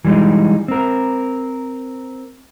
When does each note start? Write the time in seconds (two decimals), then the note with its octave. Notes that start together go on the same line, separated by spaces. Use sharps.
0.05 E3 G3 G#3 D#4
0.68 C4 A#4